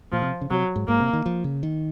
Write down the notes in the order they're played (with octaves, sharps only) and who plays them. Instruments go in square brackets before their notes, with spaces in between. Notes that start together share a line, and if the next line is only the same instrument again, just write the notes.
[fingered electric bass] A#2 [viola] F3
[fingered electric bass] C3
C#3
[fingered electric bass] C3 [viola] F#3
[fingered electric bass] G#2
[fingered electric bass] G#2 [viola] A#3
[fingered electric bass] C3
D#3
F3
C#3
D#3